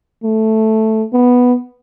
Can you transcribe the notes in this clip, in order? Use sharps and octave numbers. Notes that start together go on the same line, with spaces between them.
A3
B3